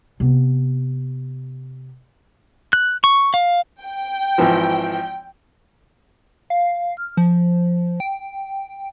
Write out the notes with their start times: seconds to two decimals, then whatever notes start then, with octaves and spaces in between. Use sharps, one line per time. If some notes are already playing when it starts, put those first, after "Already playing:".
0.20 C3 B3
2.73 F#6
3.04 C#6
3.34 F5
3.84 G5
4.38 G#1 E3 F3
6.50 F5
6.97 F6
7.17 F3
8.00 G5